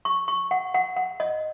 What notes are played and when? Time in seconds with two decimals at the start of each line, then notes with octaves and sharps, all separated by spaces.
0.05 C#6
0.28 C#6
0.51 F#5
0.74 F#5
0.96 F#5
1.20 D#5